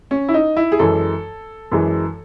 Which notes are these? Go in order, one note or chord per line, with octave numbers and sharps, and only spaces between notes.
C#4
E4
D#4
E4
G#4
F#2 E3 G#3 A4
F#2 E3 G#3